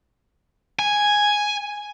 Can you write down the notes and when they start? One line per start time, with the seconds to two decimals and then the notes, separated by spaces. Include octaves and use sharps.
0.79 G#5